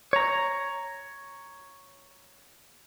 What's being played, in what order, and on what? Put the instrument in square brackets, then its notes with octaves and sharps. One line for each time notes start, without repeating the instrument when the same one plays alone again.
[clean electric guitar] C#5 A#5